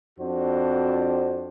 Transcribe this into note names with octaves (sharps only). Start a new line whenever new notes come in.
F2 C4 D4 F#4 C5